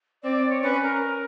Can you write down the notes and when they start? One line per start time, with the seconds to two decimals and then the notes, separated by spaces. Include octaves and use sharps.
0.23 C4 D5
0.37 D5
0.50 C#5
0.63 C#4 B4
0.83 A#4